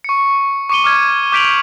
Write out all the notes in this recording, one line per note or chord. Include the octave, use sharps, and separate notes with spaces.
C#6 C#7
C#6 D6 C#7 D#7 G7
D6 F6 G#6
D6 G6 B6 D7 F7 F#7